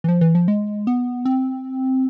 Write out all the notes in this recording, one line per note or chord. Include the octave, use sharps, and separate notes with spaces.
E3
F3
E3
F3
G#3
B3
C4